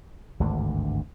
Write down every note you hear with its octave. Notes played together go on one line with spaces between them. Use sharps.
G#1 D2 G2 D3